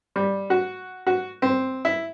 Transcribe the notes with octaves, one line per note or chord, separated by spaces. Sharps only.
G3
F#4
F#4
C4
E4